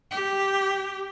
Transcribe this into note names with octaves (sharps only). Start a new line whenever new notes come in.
G4